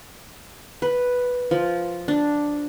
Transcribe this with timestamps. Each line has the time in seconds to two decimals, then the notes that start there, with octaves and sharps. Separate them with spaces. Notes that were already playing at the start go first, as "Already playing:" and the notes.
0.82 B4
1.51 F3
2.08 D4